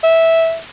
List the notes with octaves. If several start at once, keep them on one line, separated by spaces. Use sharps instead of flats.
E5